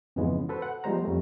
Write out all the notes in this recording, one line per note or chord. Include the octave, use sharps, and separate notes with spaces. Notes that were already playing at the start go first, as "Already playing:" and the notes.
F2 G#2 C#3 E3 G#3 B3
F#4 A4 B4 C5
F#5
F3 G3 G#3 B3 C5 A#5
F2 G3 A3